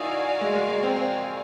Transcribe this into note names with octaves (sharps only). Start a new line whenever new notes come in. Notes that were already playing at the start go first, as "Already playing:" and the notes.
Already playing: D#4 E4 F#4 A#4 D5 F5 G#5
G#3
G#3
G#3
C4
C4